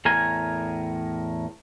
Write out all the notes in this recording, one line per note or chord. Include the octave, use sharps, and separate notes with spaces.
E2 A2 A#4 G#5